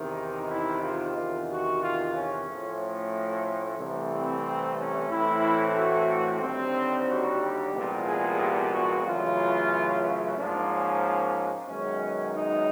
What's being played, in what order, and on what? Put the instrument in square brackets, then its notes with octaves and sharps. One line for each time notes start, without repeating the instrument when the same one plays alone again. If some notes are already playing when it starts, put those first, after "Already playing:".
Already playing: [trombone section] E2 C3 D#3 D#4
E4
F4
E2 C3 D#3
F#4
F4
C#4
A2 F3 A3
C#4
C2 C3 E3 A3
C4
C#4
A2 E3 A3 C4 E4
F#4
D#2 D3 G3 C4
F#4
G4
C2 A#2 F3 G#3 B3
G#4
G4
F#4
F#2 C#3 E3 A3 F4
G#2 F3 A#3 D4
C#4
F#2 D#3 G#3 B3 C#4
D#4